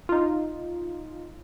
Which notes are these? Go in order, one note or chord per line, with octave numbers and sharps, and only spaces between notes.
D#4 F4